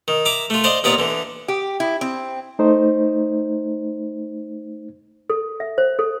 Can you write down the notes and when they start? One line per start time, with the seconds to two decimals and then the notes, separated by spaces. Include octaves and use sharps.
0.08 D#3
0.25 E4 A#5 D6
0.50 A3 F4
0.64 C5 D5 D#5 F5
0.84 D#2 A#2 B3 F4 D5 A#5
0.98 D3 E3
1.48 G4
1.80 E4
2.01 C4
2.59 A3 D#4 C5
5.30 A4
5.60 E5
5.78 C5
5.99 A4